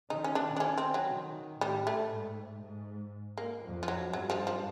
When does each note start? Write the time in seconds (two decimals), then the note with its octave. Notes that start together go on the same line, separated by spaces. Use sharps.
0.10 D#3 D#4
0.24 C#4
0.35 D4
0.56 D4
0.60 C#4
0.78 C4
0.94 F#3
1.11 D#3
1.61 A2 G3
1.87 A3
2.12 G#2
2.63 G#2
3.38 A#3
3.63 F2
3.83 F3
3.88 F#3
4.13 G2 F#3
4.30 F3
4.47 F3